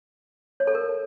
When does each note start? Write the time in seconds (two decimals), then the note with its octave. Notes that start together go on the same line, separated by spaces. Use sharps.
0.60 C#5
0.67 A4
0.75 A#4